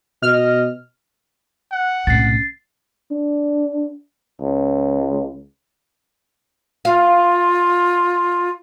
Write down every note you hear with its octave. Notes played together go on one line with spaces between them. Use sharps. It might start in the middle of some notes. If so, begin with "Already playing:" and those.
B2 D#5 F6
F#5
B1 A2 C3 C#4 A6 C7
D4
C#2
F4 F5